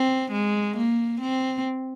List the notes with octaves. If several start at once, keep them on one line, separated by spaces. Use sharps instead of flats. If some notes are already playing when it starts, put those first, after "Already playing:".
Already playing: C4
G#3
A#3
C4